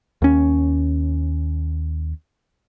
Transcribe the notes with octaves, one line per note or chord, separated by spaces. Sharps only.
D#2 C#4